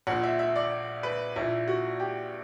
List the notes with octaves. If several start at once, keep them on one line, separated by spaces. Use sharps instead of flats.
A#1 A#2 F#5
E5
E5
D5
B4
A#1 A#2 E4
F#4
G4